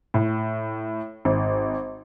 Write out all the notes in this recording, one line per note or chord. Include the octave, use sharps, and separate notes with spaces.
A2
G#1